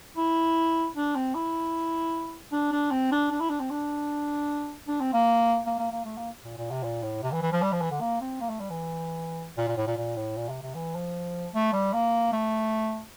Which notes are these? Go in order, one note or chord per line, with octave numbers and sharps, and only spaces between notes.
E4
D4
C4
E4
D4
D4
C4
D4
D4
E4
D4
C4
D4
D4
C4
A#3
A#3
A#3
A#3
A3
A#3
A#2
A#2
C3
A#2
A2
C3
E3
E3
F3
G3
F3
E3
D3
A#3
C4
A#3
A3
G3
E3
A#2
A#2
A2
A#2
A#2
A2
A#2
C3
C3
E3
F3
A3
G3
A#3
A3